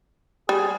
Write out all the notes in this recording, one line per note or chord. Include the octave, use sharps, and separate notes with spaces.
G3 G#4